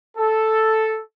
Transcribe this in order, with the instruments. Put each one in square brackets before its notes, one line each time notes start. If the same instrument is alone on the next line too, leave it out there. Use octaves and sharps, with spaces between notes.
[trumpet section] A4